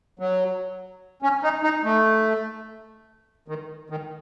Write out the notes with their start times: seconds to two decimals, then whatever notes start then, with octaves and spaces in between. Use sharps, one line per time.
0.19 F#3
1.22 C#4
1.43 D#4
1.63 D#4
1.84 A3
3.48 D#3
3.90 D#3